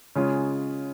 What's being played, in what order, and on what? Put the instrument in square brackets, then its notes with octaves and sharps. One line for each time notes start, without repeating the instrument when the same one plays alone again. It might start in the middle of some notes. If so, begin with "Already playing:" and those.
[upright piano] C#3 G#3 C#4 F4